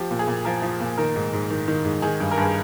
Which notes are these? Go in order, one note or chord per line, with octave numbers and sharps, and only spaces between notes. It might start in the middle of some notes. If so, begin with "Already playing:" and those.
Already playing: F3 G4
A#2
G#4
A#2
F3 A#4
F3
A#2
D#3 A#4
G#2
G#2
D#3
D#3
G#2
D#3 G#4
G2
A#4
G2 G#4